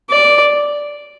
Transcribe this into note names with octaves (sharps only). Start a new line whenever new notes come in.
D5